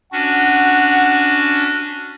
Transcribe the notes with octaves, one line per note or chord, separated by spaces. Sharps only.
C#4 D4 F#4 F#5